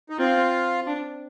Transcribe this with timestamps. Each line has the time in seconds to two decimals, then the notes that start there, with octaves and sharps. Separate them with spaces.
0.10 D#4
0.18 C4 F4
0.87 D4